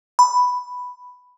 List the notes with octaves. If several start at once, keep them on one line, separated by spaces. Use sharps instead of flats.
B5